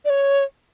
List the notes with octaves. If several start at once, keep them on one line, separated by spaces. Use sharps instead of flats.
D5
C#5